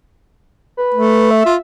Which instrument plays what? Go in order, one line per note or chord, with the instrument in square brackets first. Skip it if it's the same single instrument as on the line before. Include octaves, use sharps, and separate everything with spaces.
[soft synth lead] B4
[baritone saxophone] A3
[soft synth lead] E5
[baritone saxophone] F4